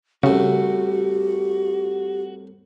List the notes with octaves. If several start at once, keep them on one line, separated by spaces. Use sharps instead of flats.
C2 A2 C#3 F#4 G4